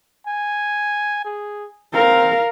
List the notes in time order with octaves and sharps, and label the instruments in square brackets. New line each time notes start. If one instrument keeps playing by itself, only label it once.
[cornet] G#5
G#4
[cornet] C4 [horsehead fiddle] A#4 F5